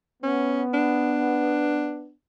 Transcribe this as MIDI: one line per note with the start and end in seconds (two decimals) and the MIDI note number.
0.23 2.11 59
0.23 0.63 61
0.74 2.12 62